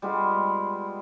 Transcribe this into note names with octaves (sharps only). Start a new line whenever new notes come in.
G3 G#3 B3 F4